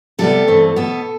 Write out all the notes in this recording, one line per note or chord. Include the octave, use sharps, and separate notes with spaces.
C3 G3 B3 A4
G2 E3 A3 C4
B2 B3 A4